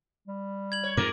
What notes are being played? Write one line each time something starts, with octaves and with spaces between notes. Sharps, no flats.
G3
G#6 F#7
C#5
F2 G#2 A#4 D6